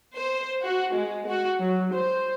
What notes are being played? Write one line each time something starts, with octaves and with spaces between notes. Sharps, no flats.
C5
F#4
G#3
F#4
F#3
C5